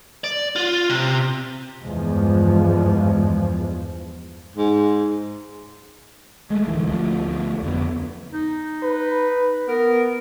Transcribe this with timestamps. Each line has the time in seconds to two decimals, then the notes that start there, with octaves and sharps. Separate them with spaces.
0.24 D5
0.56 F4
0.89 C3
1.83 E2 G2 F3 G#3
4.56 G#2
6.50 G#3 A3
6.67 D1 D3 E3
6.87 D2 F3 A3
7.63 F2 D3 B3
8.32 D#4
8.84 B4
9.68 B3 A#4